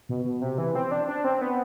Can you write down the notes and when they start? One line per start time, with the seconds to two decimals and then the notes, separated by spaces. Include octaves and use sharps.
0.09 B2
0.25 B2
0.42 C3
0.58 E3
0.75 C4
0.91 D4
1.08 D4
1.24 C4
1.41 B3